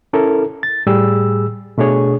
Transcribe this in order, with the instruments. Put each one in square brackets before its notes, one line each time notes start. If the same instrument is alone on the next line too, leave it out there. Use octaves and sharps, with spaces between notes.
[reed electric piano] C#4 E4 A4 A#4
A6
A2 G3 G#4 E6
B2 A3 D4 G#4 C#5